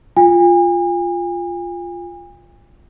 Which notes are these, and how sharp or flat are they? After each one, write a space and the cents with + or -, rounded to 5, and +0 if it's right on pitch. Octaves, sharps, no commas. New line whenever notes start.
F4 +0 G#5 -40